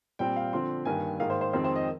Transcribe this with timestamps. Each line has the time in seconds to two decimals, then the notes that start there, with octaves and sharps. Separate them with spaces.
0.19 A#2 G3 C4 G5
0.36 F5
0.53 D3 F3 C4 C6
0.85 G2 D#3 A#3 G#5
1.19 G#2 D#3 A#3 F5
1.30 C5
1.41 C5
1.53 F2 D#3 G#3 C4 C5
1.64 C5
1.76 D#5